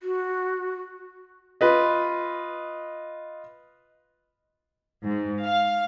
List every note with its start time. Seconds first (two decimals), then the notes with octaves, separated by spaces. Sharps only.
0.02 F#4
1.61 F4 B4 D#5
5.03 G#2
5.43 F5